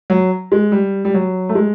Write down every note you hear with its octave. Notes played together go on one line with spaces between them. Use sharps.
F#3
G#3
G3
G3
F#3
A3
G#3